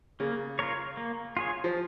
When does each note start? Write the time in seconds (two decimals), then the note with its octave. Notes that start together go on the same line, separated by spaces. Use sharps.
0.20 C#3 A#3
0.59 F4 A#4 C#5
0.97 A#3
1.37 F4 G#4 C#5
1.64 F3